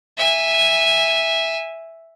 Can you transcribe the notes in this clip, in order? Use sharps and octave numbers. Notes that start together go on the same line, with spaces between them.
E5 G#5